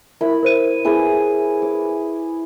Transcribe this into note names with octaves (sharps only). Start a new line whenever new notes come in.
E4 A#4 B5
A#4 C5 D#7
E4 G#4 B4
D6